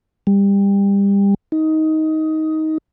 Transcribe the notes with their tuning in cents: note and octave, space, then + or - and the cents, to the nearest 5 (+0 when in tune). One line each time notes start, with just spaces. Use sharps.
G3 +25
D#4 +15